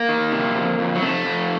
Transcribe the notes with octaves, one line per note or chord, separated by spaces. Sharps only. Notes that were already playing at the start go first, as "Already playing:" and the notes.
Already playing: A#3
D#3
C3
F2
F2
F#3
F2 A3
F2